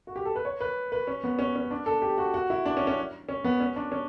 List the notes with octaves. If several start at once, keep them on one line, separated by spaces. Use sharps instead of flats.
F#4
G4
A4
B4
C#5
B4
B4
C#4
B3
C#4
C#4
D4
A4
G4
F#4
F#4
E4
D4
C#4
C#4
C#4
B3
C#4
D4
C#4